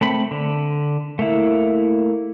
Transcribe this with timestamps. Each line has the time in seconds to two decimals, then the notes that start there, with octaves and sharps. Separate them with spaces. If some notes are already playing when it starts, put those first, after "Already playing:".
0.01 A3 C4 B5
0.31 D3
1.19 A3 A#3 E4